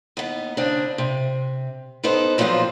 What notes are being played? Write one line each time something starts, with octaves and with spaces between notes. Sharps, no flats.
D#2 B3
C#3 A#3 C4 D4
C3
B3 D#4 A4 B4 C5
A#2 F3 F#3 B3 C4 F4